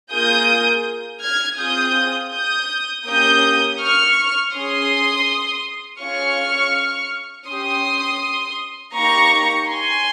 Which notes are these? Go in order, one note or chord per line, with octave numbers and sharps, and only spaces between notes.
A#3 F4 G#4 D#6 G6
F6 G#6
C4 F4 G#4 D#6 G6
D#6 G6
A#3 C#4 G4 D#6 G6
C#6 F6
C#4 G#4 C6 D#6
C#4 F4 G#4 C#6 F6
C#4 G4 C6 D#6
A#3 D#4 G4 A#5 C#6
G#5 C6